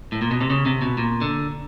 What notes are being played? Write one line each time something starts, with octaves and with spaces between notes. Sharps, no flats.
A2
A#2
B2
C3
C#3
C3
B2
A#2
D3